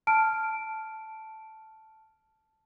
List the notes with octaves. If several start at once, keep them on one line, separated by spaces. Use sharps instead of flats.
A5 F6 D7